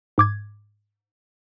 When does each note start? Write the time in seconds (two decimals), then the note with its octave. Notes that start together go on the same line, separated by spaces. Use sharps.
0.18 G#2 D6 G#6